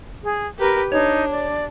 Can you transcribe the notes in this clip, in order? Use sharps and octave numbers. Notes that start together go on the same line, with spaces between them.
G#4
G4 A#4 B4
D4 D#4 C#5
D5